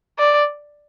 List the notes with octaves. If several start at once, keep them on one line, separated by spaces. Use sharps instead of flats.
D5